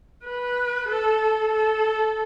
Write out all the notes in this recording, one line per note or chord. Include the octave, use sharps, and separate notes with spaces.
B4
A4
A4